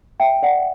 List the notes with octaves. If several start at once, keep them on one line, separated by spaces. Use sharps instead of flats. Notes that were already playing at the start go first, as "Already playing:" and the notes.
E5 G5
D5 F#5